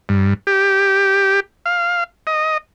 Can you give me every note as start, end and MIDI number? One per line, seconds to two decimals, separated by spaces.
0.09 0.34 43
0.47 1.40 67
1.66 2.04 77
2.27 2.58 75